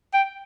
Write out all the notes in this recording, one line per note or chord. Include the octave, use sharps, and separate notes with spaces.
G5